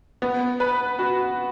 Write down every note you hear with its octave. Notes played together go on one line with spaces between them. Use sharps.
B3
B4
F#4